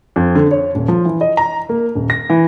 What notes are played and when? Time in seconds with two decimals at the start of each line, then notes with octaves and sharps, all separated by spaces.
0.16 F2
0.35 D3
0.51 C#5
0.75 D#1
0.88 F3
1.05 E3
1.21 D#5
1.37 A#5
1.69 A#3
1.95 D#1
2.10 A#6
2.30 E3